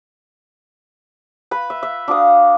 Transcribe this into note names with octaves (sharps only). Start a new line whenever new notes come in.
B4 B5
E5
E5
D4 F#4 F5 D#6